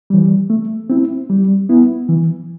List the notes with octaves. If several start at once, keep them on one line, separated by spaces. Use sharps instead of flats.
E3 G3
A3
C4 E4
G3
B3 E4
E3